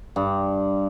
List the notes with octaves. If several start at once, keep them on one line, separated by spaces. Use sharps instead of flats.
G2